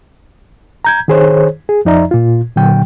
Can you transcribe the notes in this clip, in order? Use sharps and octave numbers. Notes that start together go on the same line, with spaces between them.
A#5 G6 G#6
D#3 G#4 C5 C#5
G#4
F2 F3 D#4 D5 E5 A#5
A#2 F4
A#2 D3 F#3 G5